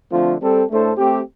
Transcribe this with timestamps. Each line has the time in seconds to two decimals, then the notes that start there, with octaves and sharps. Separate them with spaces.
0.12 D3 F3 A3 C4 F4
0.41 G3 C4 A4
0.70 A2 A3 D4 A4 C5
0.97 A3 C4 G4